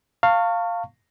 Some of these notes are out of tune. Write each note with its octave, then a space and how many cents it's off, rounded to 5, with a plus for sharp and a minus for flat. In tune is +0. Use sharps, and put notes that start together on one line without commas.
F5 +0 A5 +45 C#6 +0